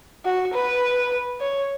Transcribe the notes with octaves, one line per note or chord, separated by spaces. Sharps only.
F#4
B4
C#5